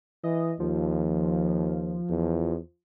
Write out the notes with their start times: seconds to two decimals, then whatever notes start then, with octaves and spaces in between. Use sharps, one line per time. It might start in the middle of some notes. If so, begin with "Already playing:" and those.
0.24 E3 D#5
0.60 D#2 F3
2.10 E2